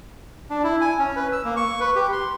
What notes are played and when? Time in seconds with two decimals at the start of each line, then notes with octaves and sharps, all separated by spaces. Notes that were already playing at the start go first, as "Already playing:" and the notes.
0.50 D4
0.63 E4
0.81 G#5
0.99 C#4
1.16 B4
1.32 E6
1.45 A#3
1.56 C#6
1.80 B4
1.95 G4
2.12 C6